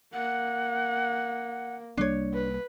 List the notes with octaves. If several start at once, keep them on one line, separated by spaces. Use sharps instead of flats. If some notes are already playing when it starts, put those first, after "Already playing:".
A#3 F#5
C2 G3 A#3 D4 C#5
B4